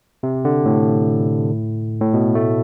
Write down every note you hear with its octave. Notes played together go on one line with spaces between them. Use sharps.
C3
D3
A2
A2
B2
A3